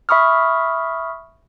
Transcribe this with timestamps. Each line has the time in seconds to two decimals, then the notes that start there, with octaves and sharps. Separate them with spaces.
0.09 E5 B5 C#6 D#6 F6